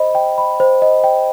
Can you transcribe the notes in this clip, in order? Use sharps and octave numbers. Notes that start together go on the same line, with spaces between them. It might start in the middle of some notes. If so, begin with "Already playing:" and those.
Already playing: C5 D#5 B5
G5
B5
C5
D#5
G5